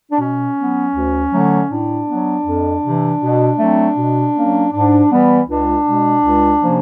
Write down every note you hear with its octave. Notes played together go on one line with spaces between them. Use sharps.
D4
B2 C#4
F#3 B3
D2
D3 F#3 A3
A2 D4
F#3 B3
F2
C3 E3
B2
F#3 A3 C4
B2
F#3 A#3 C#4
G#2 D4
E3 G3 B3
C#2 D4
B2 G#3
C#2
C3 F3 A#3 C#4